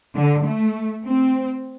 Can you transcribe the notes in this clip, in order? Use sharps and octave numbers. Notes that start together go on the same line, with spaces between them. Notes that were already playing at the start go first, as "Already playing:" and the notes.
D3
A3
C4